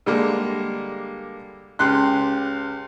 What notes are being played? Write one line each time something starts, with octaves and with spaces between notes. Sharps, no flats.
D3 G3 G#3 A#3
C#2 G4 C6 F#6